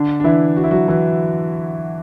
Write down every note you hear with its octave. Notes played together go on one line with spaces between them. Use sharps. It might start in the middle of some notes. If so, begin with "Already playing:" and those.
Already playing: D3 D4
D4
E3 E4
F#4
E4
F#3 F#4
E3 E4